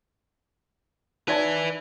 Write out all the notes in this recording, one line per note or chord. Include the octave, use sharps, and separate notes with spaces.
D#4 B4 D5 E5 A5